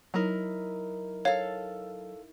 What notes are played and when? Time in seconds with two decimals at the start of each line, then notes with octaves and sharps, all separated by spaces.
0.14 F#3 D#4 E4 A#4
1.25 A4 C#5 F5